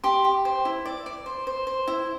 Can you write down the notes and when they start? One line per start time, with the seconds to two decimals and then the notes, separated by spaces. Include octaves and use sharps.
0.04 G4 C6
0.25 G4
0.45 C5
0.65 E4
0.85 D5
1.06 D5
1.26 C5
1.47 C5
1.67 C5
1.87 E4